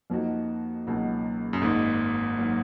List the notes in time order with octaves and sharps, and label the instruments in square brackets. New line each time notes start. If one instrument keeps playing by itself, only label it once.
[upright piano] F2 F3 A#3 D#4 F#4
C#2 B2 F#3 A#3 D#4
[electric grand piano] F#2
[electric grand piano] G#1 G#2 [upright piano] D#3 A#3 D#4
[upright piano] D#3 F#3 A#3